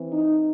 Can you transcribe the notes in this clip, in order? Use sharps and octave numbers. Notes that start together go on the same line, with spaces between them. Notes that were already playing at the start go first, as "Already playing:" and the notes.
Already playing: E3 C4
D#4